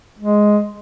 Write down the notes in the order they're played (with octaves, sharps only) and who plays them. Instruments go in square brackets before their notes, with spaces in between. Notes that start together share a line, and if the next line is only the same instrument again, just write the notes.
[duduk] G#3